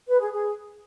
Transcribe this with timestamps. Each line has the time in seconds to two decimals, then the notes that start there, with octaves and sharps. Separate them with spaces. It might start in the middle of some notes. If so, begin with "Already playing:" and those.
0.08 B4
0.20 G#4
0.31 G#4